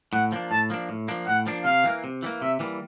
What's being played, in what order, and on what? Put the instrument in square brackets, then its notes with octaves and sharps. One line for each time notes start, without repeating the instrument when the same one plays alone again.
[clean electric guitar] A2 [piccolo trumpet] F#5
[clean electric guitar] F3 A#3 D4
[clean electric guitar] A2 [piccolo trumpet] A5
[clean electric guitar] F3 A#3 D4
A2
F3 A#3 D4
[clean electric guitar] A2 [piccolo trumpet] F#5
[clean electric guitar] F3 A#3 D4
[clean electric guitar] C3 [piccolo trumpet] F5
[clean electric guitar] E3 G3 A#3
C3
E3 G3 A#3
[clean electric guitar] C3 [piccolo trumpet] E5
[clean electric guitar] E3 G3 A#3